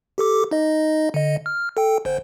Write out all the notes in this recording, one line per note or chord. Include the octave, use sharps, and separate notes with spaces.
G4 A4 D6
D#4 D#5
D3 D#5
F6
A4 G5
G1 C5